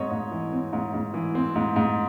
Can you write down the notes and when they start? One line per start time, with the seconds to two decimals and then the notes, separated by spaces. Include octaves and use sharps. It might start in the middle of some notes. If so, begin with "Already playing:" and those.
Already playing: G#2 C4 C#5 D#5
0.11 G#2
0.31 E3
0.53 C4
0.73 G#2
0.94 G#2
1.14 E3
1.35 C4
1.56 G#2
1.76 G#2